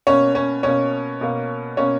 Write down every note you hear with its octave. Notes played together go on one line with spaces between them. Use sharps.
B2 A#3 C#4 C#5
C#4 C#5
B2 A#3 C#4 C#5
B2 A#3
B2 A#3 C#4 C#5